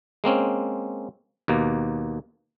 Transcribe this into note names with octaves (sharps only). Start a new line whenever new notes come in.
G#3 A#3 C4 C#4
D#2 B2 A#3